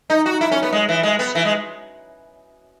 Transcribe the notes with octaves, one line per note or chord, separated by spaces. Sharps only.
D#4
F#4
E4
C#4
B3
G#3
E3
G#3
B3
E3
G#3